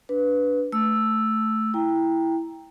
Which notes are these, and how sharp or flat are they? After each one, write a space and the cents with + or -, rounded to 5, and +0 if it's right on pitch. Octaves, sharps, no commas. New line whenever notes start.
D4 -10 B4 +0
A3 +0 E6 +0
E4 +0 G5 +10 A#5 +0